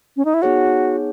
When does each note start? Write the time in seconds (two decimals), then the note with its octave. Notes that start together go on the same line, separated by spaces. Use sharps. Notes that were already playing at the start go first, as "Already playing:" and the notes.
0.17 C#4
0.25 D#4
0.34 E4
0.42 B3 D#4 F#4 G#4 C#5 F#5